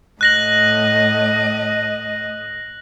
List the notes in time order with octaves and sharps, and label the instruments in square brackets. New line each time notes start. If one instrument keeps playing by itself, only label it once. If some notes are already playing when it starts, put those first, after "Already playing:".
[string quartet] A2 D#5 [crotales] F#6 A#6 F#7